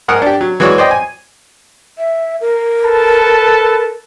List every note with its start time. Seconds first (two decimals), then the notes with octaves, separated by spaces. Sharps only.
0.08 G#2 A#4 F#5 D#6
0.22 D4 G4
0.41 F#3
0.60 E3 G#3 F#4 C#5 D5
0.78 C5 D5 D#5 G5
0.91 G#5
1.98 E5
2.41 A#4
2.85 A4 B4 A5